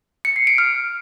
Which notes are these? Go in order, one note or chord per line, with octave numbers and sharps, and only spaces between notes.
C#7
C7
D7
F6